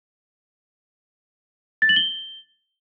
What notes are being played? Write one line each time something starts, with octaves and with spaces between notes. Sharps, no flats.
A6
F#7
G7